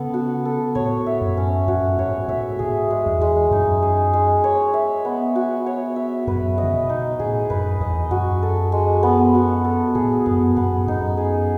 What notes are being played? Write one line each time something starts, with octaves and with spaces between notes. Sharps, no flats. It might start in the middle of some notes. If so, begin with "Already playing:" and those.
Already playing: C#3 B3 A4
F#4
A4
A2 C#5
E5
F#2
C#4
F#2 F#4
G#2 C#5
G#2 E5
G#2 G#4
G#3
E2
G#3
F#2 D#4
G#4
G#3
C#5
E5
B3
F#4
C#5
E5
F#2 B4
D#5
C#3
B2
D#4
A2 G#4
F#2 B4
E2 D#5
F#2 F#4
A4
G#3
B3
F#4
A4
A2 G#4
F#2 B3
F#2 B3
F#2 D#4
G#4